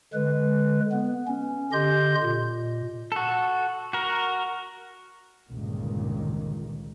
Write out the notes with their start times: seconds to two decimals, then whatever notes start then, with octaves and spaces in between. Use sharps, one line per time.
0.14 D3 G#3 B4
0.92 B3
1.28 C#4
1.73 D3 G4 D#5 C6 G6
2.23 A#2
3.12 F#4 A4
3.93 F#4 A#4
5.49 G1 C#2 G2 A#2 D#3